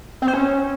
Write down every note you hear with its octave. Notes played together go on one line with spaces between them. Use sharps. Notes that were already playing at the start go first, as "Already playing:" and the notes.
C4
C5
C#4